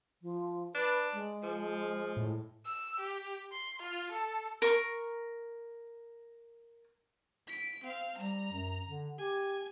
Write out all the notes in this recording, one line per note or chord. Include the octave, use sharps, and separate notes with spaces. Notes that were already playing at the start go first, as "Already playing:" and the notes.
F3
D4 B4
G#3
F3
A2
E6
G4
C6
F4
A4
A#4 C#6
B6 D7
C4 F5
G3 A#5
F#2
D3
G4 G#5